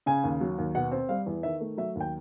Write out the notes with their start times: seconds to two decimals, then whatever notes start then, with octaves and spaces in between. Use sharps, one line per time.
0.06 C#3 G#5
0.24 D#2
0.41 F#3
0.58 D#2
0.75 B2 F#5
0.91 C4
1.09 G3 F5
1.26 E2
1.43 D#3 E5
1.61 A3
1.77 F#3 E5
1.95 D#2
2.01 G5